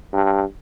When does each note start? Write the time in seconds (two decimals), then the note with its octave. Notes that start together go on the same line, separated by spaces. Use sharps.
0.13 G2